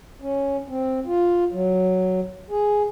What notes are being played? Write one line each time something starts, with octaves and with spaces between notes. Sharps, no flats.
C#4
C4
F4
F#3
G#4